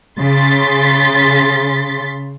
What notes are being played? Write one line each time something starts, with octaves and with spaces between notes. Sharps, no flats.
C#3 C6 A6 B6